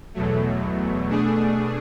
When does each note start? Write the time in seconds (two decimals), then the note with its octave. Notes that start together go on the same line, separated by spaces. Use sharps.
0.14 E2 B2 F#3 A3
1.09 B2 A3 D4 G#4